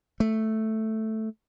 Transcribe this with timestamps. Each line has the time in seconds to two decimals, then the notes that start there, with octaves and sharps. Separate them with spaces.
0.20 A3